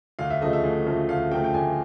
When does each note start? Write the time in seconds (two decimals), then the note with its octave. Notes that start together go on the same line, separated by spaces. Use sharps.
0.19 D2 F5
0.30 E5
0.42 C#3 F3 A3 D#5
0.53 E5
0.64 D2
0.86 C#3 F3 A3
1.09 D2 F5
1.31 C#3 F3 A3 G5
1.44 G5
1.54 D2 G#5